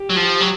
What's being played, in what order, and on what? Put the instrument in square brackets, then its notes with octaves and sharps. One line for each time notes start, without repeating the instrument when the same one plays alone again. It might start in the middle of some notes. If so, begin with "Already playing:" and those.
Already playing: [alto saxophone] G4
[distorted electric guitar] F#3
F3
F#3